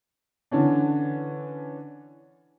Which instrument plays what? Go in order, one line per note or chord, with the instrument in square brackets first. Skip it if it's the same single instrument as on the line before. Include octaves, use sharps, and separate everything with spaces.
[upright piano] D3 E3 C#4 D4